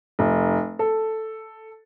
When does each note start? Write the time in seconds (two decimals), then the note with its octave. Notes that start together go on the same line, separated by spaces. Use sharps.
0.19 F1
0.79 A4